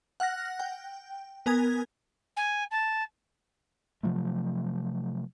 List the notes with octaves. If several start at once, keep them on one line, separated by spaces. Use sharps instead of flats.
F#5 F6 F#6 A#6
G5
B3 A#4 G#5 D#6 G#6
G#5
A5
C3 F3 F#3 A3